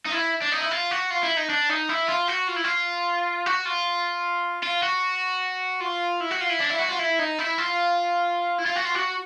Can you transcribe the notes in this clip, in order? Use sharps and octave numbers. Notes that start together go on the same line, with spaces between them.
D#4
E4
D4
D#4
E4
F4
F#4
F4
E4
D#4
D4
D#4
E4
F4
F#4
F4
E4
F4
F#4
F4
F4
F#4
F4
E4
F#4
F4
E4
D4
E4
F#4
F4
E4
D#4
E4
F4
E4
F4
F#4
F4
F#4